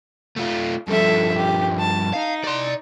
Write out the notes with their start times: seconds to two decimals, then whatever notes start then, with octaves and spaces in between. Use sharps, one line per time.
0.36 A3 F4
0.88 G2 F3 A4 E5
1.36 G4
1.80 A5
2.13 D#4 F5
2.44 D5 C6